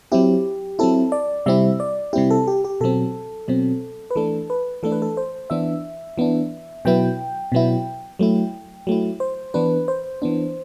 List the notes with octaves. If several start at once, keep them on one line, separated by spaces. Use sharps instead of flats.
F#3 C4 E4 G4
F#3 C4 E4 A4
D5
C3 G3 C4 E4 E5
D5
C3 G3 C4 E4 G4
A4
G4
G4
B2 F#3 C4 A4
B2 F#3 C4
B4
E3 A3 D4 A4
B4
E3 A3 D4 A4
B4
A4
C5
E3 B3 D4 E5
E3 B3 D4
B2 F#3 B3 E4 G5
B2 F#3 B3 E4
F#3 A3 E4
F#3 A3 E4
C5
E3 B3 D4 B4
C5
E3 B3 D4